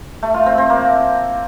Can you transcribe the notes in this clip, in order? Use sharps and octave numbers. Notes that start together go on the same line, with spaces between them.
A3
F4
C4
C4
A#3